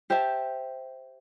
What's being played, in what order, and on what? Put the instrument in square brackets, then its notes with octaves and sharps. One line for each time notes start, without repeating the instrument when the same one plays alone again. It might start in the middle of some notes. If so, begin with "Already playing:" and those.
[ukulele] G4 C5 E5 A5